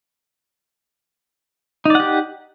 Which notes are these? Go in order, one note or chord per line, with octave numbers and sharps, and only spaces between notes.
D#4 G4 D5 F#5